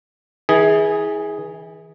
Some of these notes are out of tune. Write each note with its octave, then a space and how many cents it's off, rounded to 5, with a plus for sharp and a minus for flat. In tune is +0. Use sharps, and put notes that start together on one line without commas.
E3 -35 G#4 +0